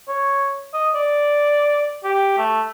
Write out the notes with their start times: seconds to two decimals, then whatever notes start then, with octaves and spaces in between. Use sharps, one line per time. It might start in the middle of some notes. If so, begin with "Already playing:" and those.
0.08 C#5
0.73 D#5
0.94 D5
2.04 G4
2.37 A3